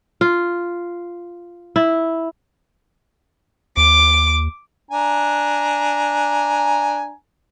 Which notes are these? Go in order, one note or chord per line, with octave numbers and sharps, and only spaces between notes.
F4
E4
D#2 D6
D4 G#5 A#5